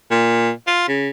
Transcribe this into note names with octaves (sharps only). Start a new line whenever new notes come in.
A#2
F4
C#3